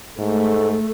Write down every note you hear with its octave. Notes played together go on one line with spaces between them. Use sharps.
G#2 A3